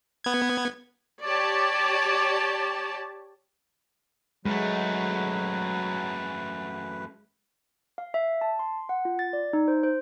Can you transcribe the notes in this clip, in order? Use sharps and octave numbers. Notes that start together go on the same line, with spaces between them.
B3 G#6
G4 C#5 D5 A5
F#2 F#3 G#3 A3 B4
F5
E5
A5
C6
F#5
F4
A6
D5
D#4
C5
C5